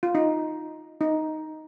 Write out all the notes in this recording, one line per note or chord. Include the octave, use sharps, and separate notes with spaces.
F4
D#4
D#4